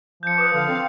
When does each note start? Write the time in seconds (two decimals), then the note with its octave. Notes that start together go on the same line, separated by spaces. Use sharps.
0.23 F3 G6 C#7
0.38 B4 D6 D#6
0.54 D3 F5
0.69 C4